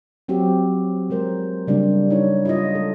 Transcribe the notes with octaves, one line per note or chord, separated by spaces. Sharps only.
F#3 C4 F#4 G4
F3 G#3 A#4 C5
C#3 G3 A#3 D4
D#4 E4 C#5
E4 F4 D#5
G#3 A4